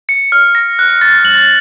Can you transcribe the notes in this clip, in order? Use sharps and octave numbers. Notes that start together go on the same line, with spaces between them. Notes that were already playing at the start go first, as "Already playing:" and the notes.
C#7
F6
A#6
F#6
A6
F#7